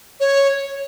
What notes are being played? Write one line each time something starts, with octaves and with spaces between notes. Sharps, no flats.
C#5